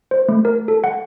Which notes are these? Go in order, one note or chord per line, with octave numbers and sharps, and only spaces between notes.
C5
A3
A#4
A4
F#5